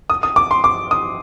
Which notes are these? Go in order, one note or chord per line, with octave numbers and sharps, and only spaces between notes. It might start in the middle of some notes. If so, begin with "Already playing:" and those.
D#6
D#6
D6
C6
D6
D#6